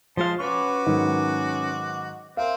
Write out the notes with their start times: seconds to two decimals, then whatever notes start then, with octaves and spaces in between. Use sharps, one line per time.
0.17 F3 G#3 C5 F5 A5
0.40 C#4 F#4 B4 C#5 D6
0.86 G#2 D#3 F#3
2.37 C4 A#4 E5 F5